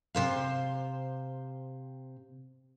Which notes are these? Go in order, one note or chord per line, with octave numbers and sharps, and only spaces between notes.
C3 C5 F5